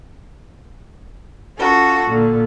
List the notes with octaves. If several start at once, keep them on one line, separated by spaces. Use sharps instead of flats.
C#4 F4 F#4 A4
A#2 D3